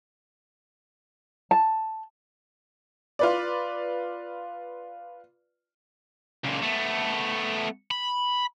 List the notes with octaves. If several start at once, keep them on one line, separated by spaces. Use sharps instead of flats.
A5
F4 B4 D5
C#2 A#2
A3 B3
B5